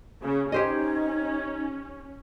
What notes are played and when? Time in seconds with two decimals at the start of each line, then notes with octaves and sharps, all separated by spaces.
0.22 C#3
0.52 C#4 D#4 G4 C5 D#5 G#5 G#6